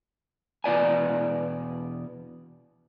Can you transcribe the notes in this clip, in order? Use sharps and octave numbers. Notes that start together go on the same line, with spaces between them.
E2 B2 D5 G#5